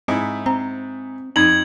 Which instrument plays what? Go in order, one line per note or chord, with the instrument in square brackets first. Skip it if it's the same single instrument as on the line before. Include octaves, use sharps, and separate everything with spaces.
[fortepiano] G#2 E4 [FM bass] C4
[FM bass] C4 [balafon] A#5
[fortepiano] F2 [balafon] D#4 [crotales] G#6 F#7